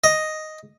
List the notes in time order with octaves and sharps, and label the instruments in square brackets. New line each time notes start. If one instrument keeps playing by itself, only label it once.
[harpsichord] D#5